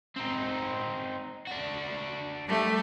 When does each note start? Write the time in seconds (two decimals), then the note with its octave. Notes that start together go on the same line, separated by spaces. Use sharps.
0.16 C4 D#4
1.47 D4 F#4
2.47 G3 A3